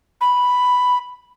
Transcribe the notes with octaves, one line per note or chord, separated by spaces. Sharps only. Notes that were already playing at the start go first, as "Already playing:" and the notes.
B5